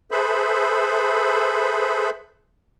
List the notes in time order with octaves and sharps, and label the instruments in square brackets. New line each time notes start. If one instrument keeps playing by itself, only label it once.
[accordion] G#4 A4 B4 C5 E5 B5